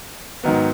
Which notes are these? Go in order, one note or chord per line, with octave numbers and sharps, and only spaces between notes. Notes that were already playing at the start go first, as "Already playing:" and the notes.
G#2 D#3 F#3 B3